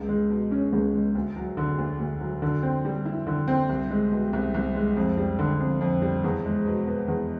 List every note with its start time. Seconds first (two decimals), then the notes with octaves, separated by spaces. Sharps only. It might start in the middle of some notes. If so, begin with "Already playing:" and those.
Already playing: C#2
0.09 G#3
0.30 B2
0.51 C#4
0.73 C#2
0.93 G#3
1.15 D2
1.36 F#3
1.57 D3
1.78 D2
2.00 D2
2.21 F#3
2.42 D3
2.63 C4
2.85 G3
3.05 E4
3.27 D3
3.48 C4
3.69 C2
3.90 G#3
4.12 B2
4.33 C2
4.54 C2
4.75 G#3
4.97 F2
5.17 G3
5.39 D3
5.60 F2
5.81 F2
6.02 G3
6.24 E2
6.45 G#3
6.66 B2
6.87 B3
7.08 E2